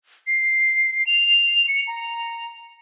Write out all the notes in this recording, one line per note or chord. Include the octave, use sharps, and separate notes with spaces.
C7
F7
C#7
A#5